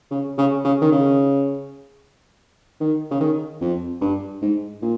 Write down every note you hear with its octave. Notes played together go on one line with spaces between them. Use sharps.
C#3
C#3
C#3
D#3
C#3
D#3
C#3
D#3
F2
G2
G#2
A#2